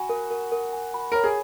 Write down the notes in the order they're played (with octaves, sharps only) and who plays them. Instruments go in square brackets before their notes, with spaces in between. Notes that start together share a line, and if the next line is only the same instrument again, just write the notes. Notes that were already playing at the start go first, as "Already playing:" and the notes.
Already playing: [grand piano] F#4 [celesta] G#5 B5
[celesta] A#4
A#4
A#4
G#5
B5
[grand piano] A#4 [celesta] C#5
[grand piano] G#4